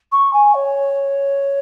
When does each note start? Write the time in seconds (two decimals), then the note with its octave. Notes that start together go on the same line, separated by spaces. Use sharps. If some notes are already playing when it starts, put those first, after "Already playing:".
0.12 C#6
0.33 G#5
0.55 C#5